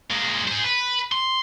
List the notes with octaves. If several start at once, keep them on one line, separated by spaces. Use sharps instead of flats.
A#2 G#3
G#4 C5
B4
C6